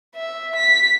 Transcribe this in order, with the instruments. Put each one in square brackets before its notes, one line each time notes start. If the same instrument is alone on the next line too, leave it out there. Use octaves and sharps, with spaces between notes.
[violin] E5
B6